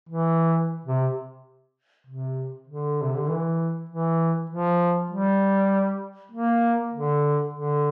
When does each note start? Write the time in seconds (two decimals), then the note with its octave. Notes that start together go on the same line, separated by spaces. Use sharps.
0.09 E3
0.85 C3
2.07 C3
2.67 D3
3.02 C3
3.16 D3
3.28 E3
3.89 E3
4.50 F3
5.10 G3
6.32 A#3
6.93 D3
7.54 D3